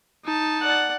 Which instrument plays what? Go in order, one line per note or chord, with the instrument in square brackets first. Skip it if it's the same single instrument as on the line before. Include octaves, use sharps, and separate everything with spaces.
[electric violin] D#4 A5
[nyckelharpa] D5 F#5